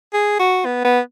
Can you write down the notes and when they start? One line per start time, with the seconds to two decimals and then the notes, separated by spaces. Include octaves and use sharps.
0.13 G#4
0.39 F#4
0.65 B3
0.85 B3